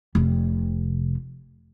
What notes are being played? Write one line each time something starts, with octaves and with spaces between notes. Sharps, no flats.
F1 C3